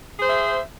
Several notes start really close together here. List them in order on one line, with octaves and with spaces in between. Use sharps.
G#4 C5 E5